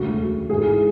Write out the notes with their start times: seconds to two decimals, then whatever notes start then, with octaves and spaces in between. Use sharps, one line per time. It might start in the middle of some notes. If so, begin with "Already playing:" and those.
Already playing: E1 D2 C#3 F#3 F#4
0.50 G#1 G#2 E3 G#3 G#4